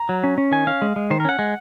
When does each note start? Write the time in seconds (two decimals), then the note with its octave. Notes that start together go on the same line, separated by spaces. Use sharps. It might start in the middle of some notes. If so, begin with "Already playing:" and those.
Already playing: A#5
0.09 F#3
0.24 C#4
0.38 C#4
0.52 D#3 G#5
0.67 C#4 F5
0.82 G#3
0.96 G#3
1.10 D#3 C5
1.20 A#4
1.25 C#4 F#5
1.39 G#3